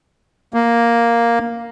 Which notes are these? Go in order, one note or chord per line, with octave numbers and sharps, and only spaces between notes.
A#3